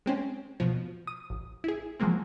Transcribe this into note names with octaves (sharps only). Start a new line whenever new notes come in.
G#3 C4 C#4
B2 F3
D#6
A1
E4 G#4
F3 F#3 G#3 A#3 C4